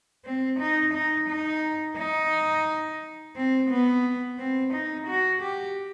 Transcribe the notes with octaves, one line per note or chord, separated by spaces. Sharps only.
C4
D#4
D#4
D#4
D#4
C4
B3
C4
D#4
F#4
G4